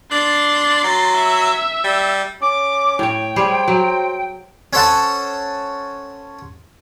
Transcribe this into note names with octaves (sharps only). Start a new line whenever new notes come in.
D4 C6 A6
F#3
E5
G3
C#4 D6
A2 C#5 G5
G3 G#4 C5
F#3
C#4 A4 C5 F#5 A5